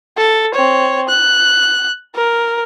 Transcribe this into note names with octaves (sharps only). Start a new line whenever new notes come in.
A4
C4 C#5
F#6
A#4